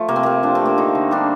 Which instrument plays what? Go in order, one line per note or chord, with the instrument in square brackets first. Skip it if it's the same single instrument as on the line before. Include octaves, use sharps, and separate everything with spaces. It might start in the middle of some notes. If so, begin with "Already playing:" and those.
Already playing: [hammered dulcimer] F3 A3
C3 A#3
C4
C3 A#3
F3 D4
C4
A3
A#3
D3 D#4
D3
G3 D4